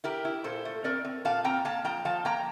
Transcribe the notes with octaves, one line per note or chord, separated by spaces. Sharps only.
E4 G4 A#4
E4
A#2 A4 C5
A3
C4 A#4 D5
C4
A#2 F5 A5
C4 G5 A#5
A#3 F5 A5
F3 G5 A#5
F3 F5 A5
A#3 G5 A#5